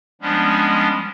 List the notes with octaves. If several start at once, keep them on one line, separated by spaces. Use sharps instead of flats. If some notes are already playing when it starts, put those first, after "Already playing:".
F3 G3 G#3 B3 C#4 D4